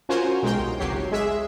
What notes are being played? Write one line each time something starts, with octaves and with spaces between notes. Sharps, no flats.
C#4 F4 F#4 A#4 C5 G#5
B1 G#3 A#4 G5 C6
C2
G#1 C#2 F#3 G4 C#5 C7
G#3 G#4 E5